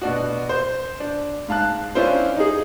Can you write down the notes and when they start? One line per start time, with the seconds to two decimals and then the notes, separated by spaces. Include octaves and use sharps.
0.02 B2 D4 F#4
0.49 C5
1.00 D4
1.48 G#2 F5 A5 F#6
1.95 C#4 D4 E4 F4 C5
2.36 D#4 G#4